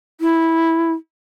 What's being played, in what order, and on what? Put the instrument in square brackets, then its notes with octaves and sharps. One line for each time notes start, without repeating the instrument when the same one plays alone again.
[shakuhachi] E4